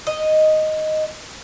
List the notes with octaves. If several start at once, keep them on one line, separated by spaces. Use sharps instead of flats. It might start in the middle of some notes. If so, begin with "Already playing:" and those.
D#5